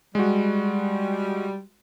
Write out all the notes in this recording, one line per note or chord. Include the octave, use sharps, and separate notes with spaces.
G3 G#3 F#4